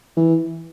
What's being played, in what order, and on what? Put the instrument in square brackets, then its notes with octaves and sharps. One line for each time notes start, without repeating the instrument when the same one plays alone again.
[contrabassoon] E3